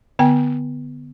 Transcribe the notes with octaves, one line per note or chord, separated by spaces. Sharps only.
D3 B3 G5